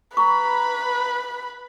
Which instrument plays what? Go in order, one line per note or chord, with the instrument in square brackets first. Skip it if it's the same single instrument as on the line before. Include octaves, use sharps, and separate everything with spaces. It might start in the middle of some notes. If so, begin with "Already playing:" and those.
[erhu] B4 [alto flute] A#5 [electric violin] B5 [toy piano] C#6